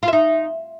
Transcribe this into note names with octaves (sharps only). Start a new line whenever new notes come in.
F4
E5
D#4